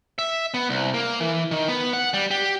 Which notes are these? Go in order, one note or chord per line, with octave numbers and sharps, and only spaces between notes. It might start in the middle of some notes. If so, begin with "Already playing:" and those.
E5
B3
C2
A#3
E3
D#3
B3
F#5
G3
G4